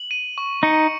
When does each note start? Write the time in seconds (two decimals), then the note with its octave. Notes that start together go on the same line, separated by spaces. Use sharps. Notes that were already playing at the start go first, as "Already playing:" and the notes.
Already playing: F#7
0.11 D#7
0.38 C#6
0.63 D#4 C#7